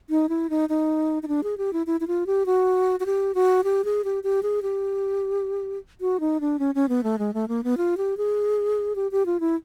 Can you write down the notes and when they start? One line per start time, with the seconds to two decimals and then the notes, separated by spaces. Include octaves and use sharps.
0.10 D#4
0.29 E4
0.50 D#4
0.69 D#4
1.23 D#4
1.28 D4
1.43 G#4
1.58 G4
1.73 E4
1.87 E4
2.00 E4
2.07 F4
2.27 G4
2.46 F#4
3.00 F#4
3.06 G4
3.35 F#4
3.64 G4
3.85 G#4
4.04 G4
4.24 G4
4.43 G#4
4.63 G4
6.01 F#4
6.20 D#4
6.41 D4
6.59 C#4
6.75 C#4
6.89 B3
7.04 A3
7.19 G#3
7.34 A3
7.48 A#3
7.64 B3
7.77 F4
7.97 G4
8.17 G#4
8.95 G4
9.11 G4
9.26 F4
9.40 E4